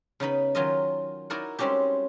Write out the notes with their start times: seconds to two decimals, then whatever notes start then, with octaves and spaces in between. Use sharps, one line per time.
0.20 C#3 B3 D#4 B5
0.55 D#3 F#3 C#4 F4 A#4 D#5
1.30 D#4 E4 F#4 A#4 D5 F#5
1.59 G3 G#3 C4 C#4 F#4 G4